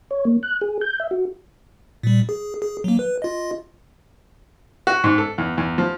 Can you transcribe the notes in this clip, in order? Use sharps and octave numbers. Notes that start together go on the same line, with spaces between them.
C#5
A#3
F#6
G#4
G6
E5
F#4
A#2 G3
G#4
G#4
F#3 A#3
B4
F4 D#5
F#4
G#2
A4
E2
E2
F3